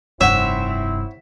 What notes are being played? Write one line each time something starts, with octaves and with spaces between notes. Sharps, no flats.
F1 G2 C4 E4 C#5 E5 F#5